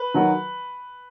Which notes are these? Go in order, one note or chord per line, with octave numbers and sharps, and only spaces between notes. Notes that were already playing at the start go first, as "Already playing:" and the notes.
Already playing: B4
D#3 F#3